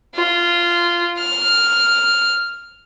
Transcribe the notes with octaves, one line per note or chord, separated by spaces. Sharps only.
F4
F6